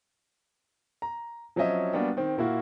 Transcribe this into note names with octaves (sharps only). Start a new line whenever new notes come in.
A#5
F3 F#3 C4 C#4 D#5 E5
G3 A#3 B3 D4 F#4
D#3 C4
A#2 A#3 E4 F#4